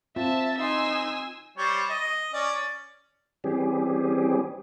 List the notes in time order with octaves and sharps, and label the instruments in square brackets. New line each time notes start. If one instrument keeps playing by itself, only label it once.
[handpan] C4 F4 [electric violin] E5 A5
[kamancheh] D#4 C6 [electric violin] G#5 E6
[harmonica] G3 C5 C#5
D#5
C#4 D5
[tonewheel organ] E3 G3 C4 C#4 G4 G#4